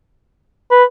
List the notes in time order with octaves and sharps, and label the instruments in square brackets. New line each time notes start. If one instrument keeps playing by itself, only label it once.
[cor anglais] B4